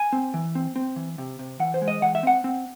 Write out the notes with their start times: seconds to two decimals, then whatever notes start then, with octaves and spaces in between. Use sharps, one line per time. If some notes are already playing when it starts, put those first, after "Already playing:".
Already playing: G#5
0.13 C4
0.34 E3
0.55 C4
0.76 C4
0.96 E3
1.18 C3
1.39 C3
1.60 E3 F#5
1.74 C5
1.82 G#3
1.88 D#5
2.02 E3 F#5
2.15 E5
2.23 C4 F#5
2.44 C4